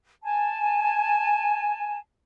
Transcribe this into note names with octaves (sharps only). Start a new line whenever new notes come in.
G#5 A5